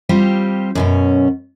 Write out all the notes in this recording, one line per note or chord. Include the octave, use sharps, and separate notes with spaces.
G3 C4 F4 G4
F#2 B2 C#4